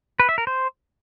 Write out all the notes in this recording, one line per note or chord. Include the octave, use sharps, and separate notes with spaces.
B4
E5
A#4
C5